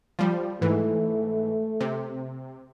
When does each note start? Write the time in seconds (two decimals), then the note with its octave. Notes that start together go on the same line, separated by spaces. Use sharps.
0.19 F3 G3
0.61 G#2 E3 A3
1.81 C3